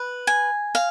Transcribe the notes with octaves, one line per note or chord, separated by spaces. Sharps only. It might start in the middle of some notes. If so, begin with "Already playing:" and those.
Already playing: B4
G#5
F5